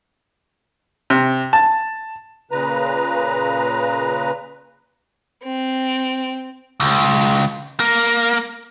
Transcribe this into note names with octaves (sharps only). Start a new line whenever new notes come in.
C3
A5
A#2 C#3 B4 A#5
C4
C#2
A#3